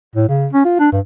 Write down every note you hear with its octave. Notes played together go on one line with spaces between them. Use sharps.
A2
C#3
C#4
F4
D4
G2